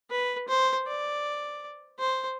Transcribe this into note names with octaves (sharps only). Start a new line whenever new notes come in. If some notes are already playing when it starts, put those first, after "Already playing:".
B4
C5
D5
C5